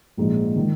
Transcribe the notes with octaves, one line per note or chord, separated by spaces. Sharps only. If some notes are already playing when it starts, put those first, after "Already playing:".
A#1 G#2 F3
D#3 G#3